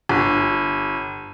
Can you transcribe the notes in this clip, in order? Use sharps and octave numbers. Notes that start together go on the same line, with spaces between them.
G1